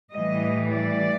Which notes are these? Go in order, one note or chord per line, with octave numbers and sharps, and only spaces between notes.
A2 E3 G3 D#5
D5